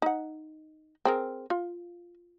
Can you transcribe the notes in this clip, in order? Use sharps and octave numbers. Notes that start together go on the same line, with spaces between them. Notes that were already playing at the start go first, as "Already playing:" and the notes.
D#4 F#5
C4 G#4 A#4
F4